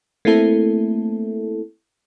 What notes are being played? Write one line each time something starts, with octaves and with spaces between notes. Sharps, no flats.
A3 A#3 C4 E4 A4